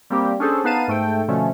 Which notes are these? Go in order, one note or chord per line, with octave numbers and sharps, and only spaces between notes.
G3 A#3 C4 G4
C#4 D4 G#4 A4 C5
B3 D#4 B4 F5 A5 D#7
G#2 A3 A4 G5
B2 D3 F3 A3 C#4